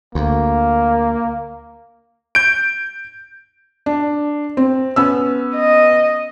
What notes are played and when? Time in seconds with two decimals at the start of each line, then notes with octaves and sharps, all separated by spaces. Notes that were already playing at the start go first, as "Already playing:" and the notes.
0.15 D2 A#3
2.35 G6 D7
3.86 D4
4.57 C4
4.96 B3 C#4 E6
5.56 D#5